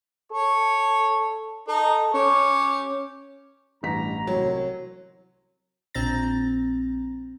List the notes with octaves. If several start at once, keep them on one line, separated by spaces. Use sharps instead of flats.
A4 C#5
D#4 A4
C#4 G4 C#5
A1 G2 A#5 B6
C2 F#3 C4 C#5
A#1 C4 A#5 A6